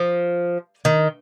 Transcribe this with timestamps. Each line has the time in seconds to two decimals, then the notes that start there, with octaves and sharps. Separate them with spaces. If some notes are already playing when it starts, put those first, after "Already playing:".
Already playing: F3
0.85 D#3